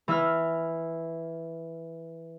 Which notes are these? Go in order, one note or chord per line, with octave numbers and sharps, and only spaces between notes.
E3 E6 F6